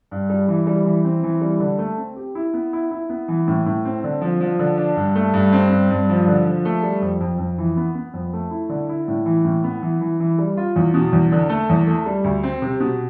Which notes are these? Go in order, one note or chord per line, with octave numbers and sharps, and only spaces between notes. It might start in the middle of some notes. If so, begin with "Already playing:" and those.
G2
G3
E3
G3
E3
C4
E3
G3
D3
A3
C4
G4
E4
B3
E4
E4
B3
E3
A2
A2
C4
D3
F3
F3
D3
D4
G2
A3
G2
C4
G2
G2
F3
D3
F3
A3
G3
F2
F2
F2
E3
B3
B3
F2
A3
E4
D3
E4
A2
E3
A2
B3
E3
E3
E3
G3
F4
E2
B2
E2
D3
A3
E2
A3
G3
D2
C4
C3
B2